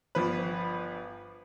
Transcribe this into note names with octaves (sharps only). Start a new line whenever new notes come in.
G1 F3 B4